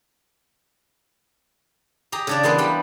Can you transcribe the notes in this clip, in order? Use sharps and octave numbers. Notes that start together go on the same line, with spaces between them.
G4 G#4 A#5
C#3 D4 D5
E3 G#3 A#3 B3
G3 G5 B5